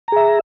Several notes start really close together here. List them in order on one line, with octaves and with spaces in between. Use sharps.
A#5 G#4 E5